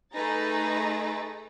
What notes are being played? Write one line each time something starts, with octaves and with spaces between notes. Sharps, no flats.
A3 D#4 G#4 B4 A#5 A6